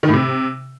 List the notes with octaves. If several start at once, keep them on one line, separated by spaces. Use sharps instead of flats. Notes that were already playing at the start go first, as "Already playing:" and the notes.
D#3
A2
C3